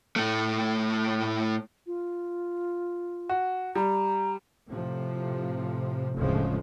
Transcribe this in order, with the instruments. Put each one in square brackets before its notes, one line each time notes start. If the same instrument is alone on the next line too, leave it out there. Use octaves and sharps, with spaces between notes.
[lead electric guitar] A2 A3
[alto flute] F4
[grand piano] F#4
[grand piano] G3 [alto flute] A#5
[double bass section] A2 C3 F3
F1 D2 A2 C#3 F3 G#3